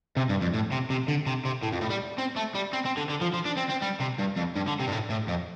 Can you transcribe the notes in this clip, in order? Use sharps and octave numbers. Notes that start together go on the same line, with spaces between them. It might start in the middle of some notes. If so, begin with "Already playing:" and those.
C3
G2
F2
A2
C3
C3
D3
C3
C3
A2
F2
A2
G3
C4
A3
G3
C4
C4
D3
D3
F3
F3
D4
C4
C4
G3
C3
G2
F2
G2
D3
C3
G2
A2
A2
F2